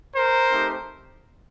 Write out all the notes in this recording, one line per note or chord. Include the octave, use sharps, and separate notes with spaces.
A#4 C5
A3 C4 D#4 G4